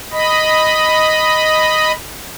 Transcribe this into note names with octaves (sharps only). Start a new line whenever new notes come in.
D#5 B5